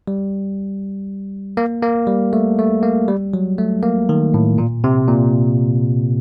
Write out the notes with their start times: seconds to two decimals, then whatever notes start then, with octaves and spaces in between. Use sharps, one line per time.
0.08 G3
1.57 A#3
1.82 A#3
2.07 G3
2.33 A3
2.59 A3
2.83 A#3
3.08 G3
3.34 F#3
3.58 A3
3.83 A#3
4.09 D#3
4.34 A2
4.58 A#2
4.84 C3
5.08 A#2